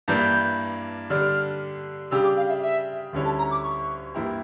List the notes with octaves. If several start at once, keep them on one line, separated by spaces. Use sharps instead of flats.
G2 E3 A#3 D4 G6
D3 G3 D4 F6
C#3 G3 D4 G4 E6
D6
F5
E5
E5
D2 D3 G3 C#4 E4
A5
A#5
D6
C#6
G2 E3 A#3 E4 G4